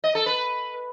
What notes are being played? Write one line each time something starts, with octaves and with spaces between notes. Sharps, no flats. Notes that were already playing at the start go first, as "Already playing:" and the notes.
D#5
A4
B4